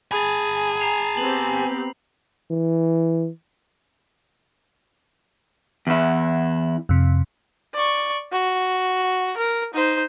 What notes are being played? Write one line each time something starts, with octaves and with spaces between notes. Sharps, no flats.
G#4 G#5 A5 B5
A#5 C7 F7
B3 C4 G4 F#7
E3
E2 E4
F2 C3
D5 C#6
F#4
A#4
D#4 C5